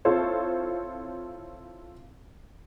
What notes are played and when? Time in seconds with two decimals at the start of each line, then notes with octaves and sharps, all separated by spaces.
0.05 C4 E4 F4 A4 C5 C#5